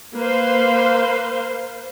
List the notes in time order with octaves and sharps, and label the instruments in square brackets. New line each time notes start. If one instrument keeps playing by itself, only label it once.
[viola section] A#3 B4 C5 F5